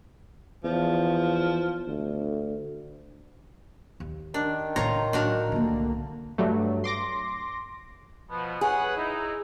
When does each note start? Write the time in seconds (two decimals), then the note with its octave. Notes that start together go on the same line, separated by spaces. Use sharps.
0.64 E2 F3
1.87 D2
4.00 D#2
4.34 D#3 D4
4.76 A2 C#3 F4 C#5 A#5
5.13 A2 F#3 D4 F#4 A#4
5.52 C2 D3 A3 A#3
6.38 G2 F#3 A3
6.84 C6 D6 A#6
8.31 B2 F3 B3
8.61 G#4 B4 C#5 F#5
8.96 D#4 E4